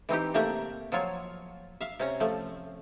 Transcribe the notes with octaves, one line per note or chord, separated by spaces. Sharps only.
E3 C4 D#4 G4
C3 A3 A#3 G4 E5 A#5
F3 F#3 F4 C#5
E5 F5
C3 C#4 A#5
F3 A3